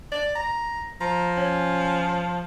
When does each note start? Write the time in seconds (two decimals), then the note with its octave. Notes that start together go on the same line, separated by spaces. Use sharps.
0.12 D5
0.36 A#5
1.01 F3 A#5
1.37 C#4